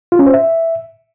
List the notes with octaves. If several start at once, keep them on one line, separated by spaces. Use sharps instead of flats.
F4
C#4
C5
E5